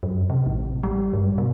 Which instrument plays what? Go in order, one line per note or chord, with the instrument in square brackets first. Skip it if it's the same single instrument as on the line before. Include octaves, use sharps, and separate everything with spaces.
[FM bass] F#2
C3
A1
G3
G2
B2